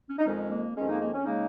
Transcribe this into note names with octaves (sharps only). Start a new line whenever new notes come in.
C#4
D#4
F2 D#3 G#3 C#4
A#3
F2 D#3 G#3 C#4
A#3 D#4
A#3
C#4
C#3 G#3 A#3 D#4